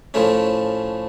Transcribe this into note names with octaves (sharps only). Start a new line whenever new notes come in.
A2 F3 A3 C#4